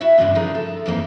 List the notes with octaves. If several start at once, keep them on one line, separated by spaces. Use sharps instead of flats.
E4 F#4 C#5 E5
E2 G2 A#2 C#3 G#3 D4
D3 F3 D#4 E4 G#4 A#4
A4
F2 E3 G#3 A#3 D#4